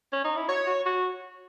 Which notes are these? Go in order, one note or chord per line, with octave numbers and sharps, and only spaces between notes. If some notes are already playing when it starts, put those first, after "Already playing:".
C#4
D#4
E4
F#4 C#5
F#4
F#4